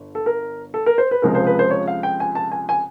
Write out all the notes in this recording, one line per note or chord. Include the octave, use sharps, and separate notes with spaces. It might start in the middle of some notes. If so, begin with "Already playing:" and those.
Already playing: G1
A4
A#4
A4
A#4
C5
B4
C#2 C3 F3 G#3 A#4
C5
B4
C5
C#5
F5
G5
G#5
A5
G#5
G#5